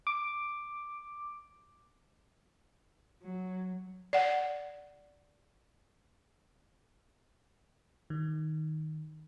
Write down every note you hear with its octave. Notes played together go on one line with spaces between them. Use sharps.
D6
F#3
D5 F#5
D#3